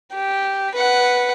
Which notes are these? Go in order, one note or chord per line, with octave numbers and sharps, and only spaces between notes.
G4
B4 F#5